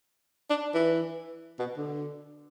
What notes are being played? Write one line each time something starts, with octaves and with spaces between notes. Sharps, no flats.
D4
E3
B2
D3